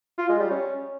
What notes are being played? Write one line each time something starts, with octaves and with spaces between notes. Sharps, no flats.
F4
G#3
G3
C#4